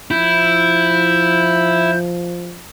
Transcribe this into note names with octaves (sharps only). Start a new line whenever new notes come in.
F3 E4 G6